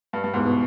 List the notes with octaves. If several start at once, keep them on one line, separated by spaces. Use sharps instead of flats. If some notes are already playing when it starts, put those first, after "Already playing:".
G2
G2
E2 G#2
B2